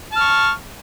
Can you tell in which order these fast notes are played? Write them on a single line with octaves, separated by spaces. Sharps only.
A5 F6 C#6